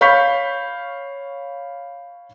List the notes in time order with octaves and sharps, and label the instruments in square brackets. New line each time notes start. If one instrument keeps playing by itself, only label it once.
[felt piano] C#5 F5 B5 C#6 G6 B6